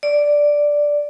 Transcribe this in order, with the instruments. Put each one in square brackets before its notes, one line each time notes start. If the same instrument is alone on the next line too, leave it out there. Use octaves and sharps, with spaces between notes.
[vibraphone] D5